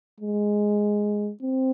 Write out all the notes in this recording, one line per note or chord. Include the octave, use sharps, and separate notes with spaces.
G#3
C4